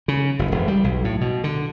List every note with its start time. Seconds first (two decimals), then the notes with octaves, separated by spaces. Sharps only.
0.08 C#3
0.39 F#1
0.52 E1
0.68 G3
0.84 B1
1.05 A2
1.21 B2
1.44 D3